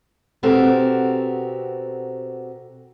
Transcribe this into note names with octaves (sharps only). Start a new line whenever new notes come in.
B2 C4 F#4 G4 A4 A#4